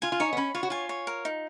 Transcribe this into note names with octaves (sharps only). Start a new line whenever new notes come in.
F4 G#5
F4
D#4 C#5
B3
C#4 B5
F4 C#5
F#4
F4 G#5
C#5
A#4
D#4